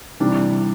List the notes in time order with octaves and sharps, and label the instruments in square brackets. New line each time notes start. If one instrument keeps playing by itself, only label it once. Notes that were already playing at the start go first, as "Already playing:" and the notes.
[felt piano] C3 E3 G3 D4